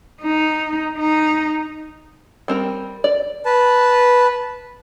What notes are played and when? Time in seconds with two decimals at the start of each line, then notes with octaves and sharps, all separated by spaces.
0.22 D#4
0.98 D#4
2.48 G3 C4 A#4
3.04 D5
3.45 B4 A5